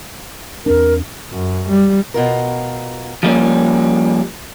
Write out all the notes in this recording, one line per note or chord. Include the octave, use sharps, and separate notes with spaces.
E2 C4 D4 A#4
F#2
G3
B2 F4 A#4
F3 G3 A#3 C#4